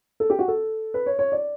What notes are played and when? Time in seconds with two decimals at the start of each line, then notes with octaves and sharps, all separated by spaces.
0.20 A4
0.30 G4
0.39 F#4
0.48 A4
0.94 B4
1.06 C#5
1.19 C#5
1.32 D5